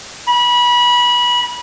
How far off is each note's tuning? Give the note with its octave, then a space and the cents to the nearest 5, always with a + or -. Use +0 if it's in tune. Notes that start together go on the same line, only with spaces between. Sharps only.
B5 -25